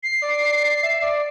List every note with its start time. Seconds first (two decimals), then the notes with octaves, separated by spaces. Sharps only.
0.03 C7
0.21 D5
0.82 E5
1.01 D5